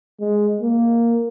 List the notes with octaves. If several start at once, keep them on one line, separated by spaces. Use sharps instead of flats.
G#3
A#3